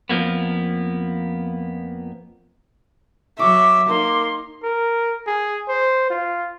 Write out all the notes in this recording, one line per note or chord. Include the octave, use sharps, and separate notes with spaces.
F2 F3 F#3 A#3 B3
F#3 E5 C#6 D6
A#3 D#4 C6
A#4
G#4
C5
F4